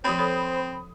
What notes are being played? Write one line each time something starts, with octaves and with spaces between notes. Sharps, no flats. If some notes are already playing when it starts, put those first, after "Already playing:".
F3 C4 C5 C#5 B5 D#6
A4 C#5